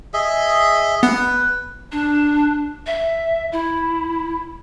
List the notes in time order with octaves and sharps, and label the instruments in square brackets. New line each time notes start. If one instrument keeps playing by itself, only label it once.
[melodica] G#4 D#5 E5
[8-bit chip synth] B3 [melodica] B4
[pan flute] D4
E5
E4